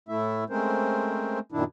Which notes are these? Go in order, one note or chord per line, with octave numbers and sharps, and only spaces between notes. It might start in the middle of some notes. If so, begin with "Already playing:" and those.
A2 A3 E4 E5
G#3 A3 C4 C#4 A#4 C5
F#2 A#2 D#3 D4 E4